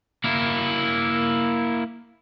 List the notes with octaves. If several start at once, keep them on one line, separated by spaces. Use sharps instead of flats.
A#3 E4